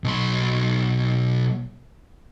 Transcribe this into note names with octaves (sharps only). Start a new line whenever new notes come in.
B1 C6